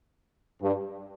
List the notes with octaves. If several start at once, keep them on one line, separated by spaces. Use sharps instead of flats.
G2